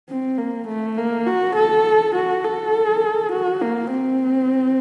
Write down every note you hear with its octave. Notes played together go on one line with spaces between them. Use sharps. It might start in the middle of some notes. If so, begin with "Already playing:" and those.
C4
A#3
A3
A#3
F#4
A4
F#4
A4
F#4
A#3
C4